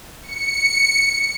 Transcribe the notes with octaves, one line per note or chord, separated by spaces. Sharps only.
C#7